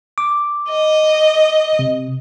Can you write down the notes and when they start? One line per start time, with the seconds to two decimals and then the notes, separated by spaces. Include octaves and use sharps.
0.18 D6
0.71 D#5
1.79 C3